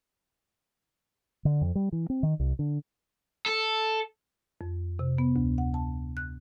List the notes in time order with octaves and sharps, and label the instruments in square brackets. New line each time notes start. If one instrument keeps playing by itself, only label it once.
[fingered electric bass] D3
F2
G3
E3
C4
D#3
C2
D3
[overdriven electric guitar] A4
[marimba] F2
C3
B3
D2
F#5
A5
F#6